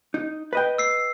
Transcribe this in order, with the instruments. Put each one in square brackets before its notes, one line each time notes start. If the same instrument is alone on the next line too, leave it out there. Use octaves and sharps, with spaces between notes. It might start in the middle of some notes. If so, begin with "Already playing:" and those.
[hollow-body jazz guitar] D#4
B4 D#5 G5
[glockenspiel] E6 C7